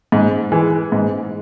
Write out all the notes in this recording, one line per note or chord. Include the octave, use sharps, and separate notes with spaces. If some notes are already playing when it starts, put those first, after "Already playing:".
G#2
E3 G#3
G#2